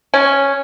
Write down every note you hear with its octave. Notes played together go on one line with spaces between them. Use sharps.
C#4